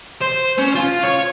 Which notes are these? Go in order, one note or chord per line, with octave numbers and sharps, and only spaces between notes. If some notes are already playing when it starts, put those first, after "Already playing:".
C5
C#4
F4
C#5